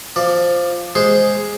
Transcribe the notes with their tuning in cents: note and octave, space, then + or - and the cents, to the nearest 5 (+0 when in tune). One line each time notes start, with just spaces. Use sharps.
F3 +0 D5 +15
G#3 +0 G#4 +0 C5 +0